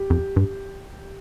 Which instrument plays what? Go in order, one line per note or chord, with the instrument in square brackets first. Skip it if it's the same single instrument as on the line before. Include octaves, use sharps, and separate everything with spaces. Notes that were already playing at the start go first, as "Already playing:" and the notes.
Already playing: [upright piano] G4
[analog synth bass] F2
G2